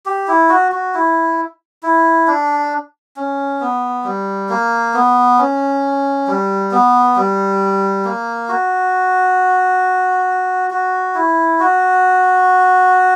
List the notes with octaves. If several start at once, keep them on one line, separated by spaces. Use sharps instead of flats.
G4
E4
F#4
F#4
E4
E4
D4
C#4
B3
G3
A#3
B3
C#4
G3
B3
G3
A#3
F#4
F#4
E4
F#4